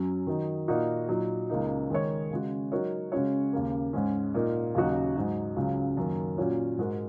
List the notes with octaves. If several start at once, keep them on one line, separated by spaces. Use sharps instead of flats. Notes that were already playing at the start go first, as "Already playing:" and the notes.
Already playing: F#2 F#3 C#4
D#3 F#3 D#4
A#2 A#3 D#4 F#4
A#2 F#3 D#4
C#2 C#3 A#3 D#4
D#3 G#3 D#4 A#4 C#5
C#3 G#3 F#4
F#3 D#4 F#4 A#4 C#5
C#3 G#3 C#4 F#4 C#5
D#2 C#3 A#3
G#2 G#3 C#4
A#2 A#3 D#4 A#4
D#2 C#3 F#3 D#4 F#4
G#2 F#3 D#4
C#2 C#3 F#3
F#2 D#3 A#3
A#2 F#3 C#4 F#4 C#5
G#2 G#3 F#4 A#4